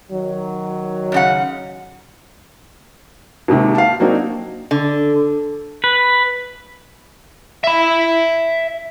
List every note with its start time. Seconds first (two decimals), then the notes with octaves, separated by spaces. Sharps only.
0.12 D#3 F#3
1.12 F#2 C#3 F#5
3.48 D#2 G#2 C3 D#3
3.75 F5 A5
4.00 F#3 A#3 C4 D4 D#4 F#4
4.71 D3
5.84 B4
7.64 E5 B5